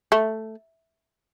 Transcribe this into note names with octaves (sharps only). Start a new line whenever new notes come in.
A3